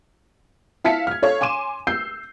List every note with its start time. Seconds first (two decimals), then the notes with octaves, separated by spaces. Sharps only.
0.84 E4 F5 A5 B6 C#7
1.07 F6 G#6
1.22 A4 C#5 F5 C#6
1.41 G#5 C6 D6 D#7 E7
1.87 E6 G6 C7